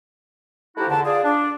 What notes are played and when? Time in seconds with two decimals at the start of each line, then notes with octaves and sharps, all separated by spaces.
0.77 F3 A3 D#4 E4 F#4 G4
0.89 E2 D3 A5
1.04 F4 G#4 D5
1.24 D4